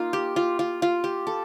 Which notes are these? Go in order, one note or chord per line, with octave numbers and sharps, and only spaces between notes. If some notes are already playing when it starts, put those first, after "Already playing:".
Already playing: A#3 D#4 F4
G4
F4
F4
F4
G4
A4